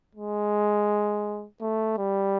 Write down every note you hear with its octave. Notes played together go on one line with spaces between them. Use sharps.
G#3
A3
G3